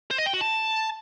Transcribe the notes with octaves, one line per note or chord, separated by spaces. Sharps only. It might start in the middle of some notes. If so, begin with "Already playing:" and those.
C5
D#5
G5
F#4
A5